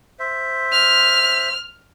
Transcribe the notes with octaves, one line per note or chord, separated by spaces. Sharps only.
C5 E5
F6